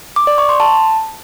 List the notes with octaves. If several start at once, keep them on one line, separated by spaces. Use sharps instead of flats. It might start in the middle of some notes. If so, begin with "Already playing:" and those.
D6
D5
C#6
C6
A5